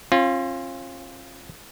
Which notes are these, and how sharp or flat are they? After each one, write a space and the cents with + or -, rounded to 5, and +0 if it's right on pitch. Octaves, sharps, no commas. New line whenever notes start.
C#4 -45 F4 +0